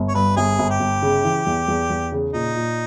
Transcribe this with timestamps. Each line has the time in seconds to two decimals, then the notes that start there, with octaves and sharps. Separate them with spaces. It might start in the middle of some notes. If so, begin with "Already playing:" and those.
Already playing: G1
0.08 C#5
0.14 G2 B4
0.37 G1 G#4
0.59 G1
0.70 G4
0.80 G1
1.02 C#3
1.24 E3
1.46 E2
1.68 E2
1.90 E2
2.12 C#3
2.34 A#2 D#4
2.56 A#2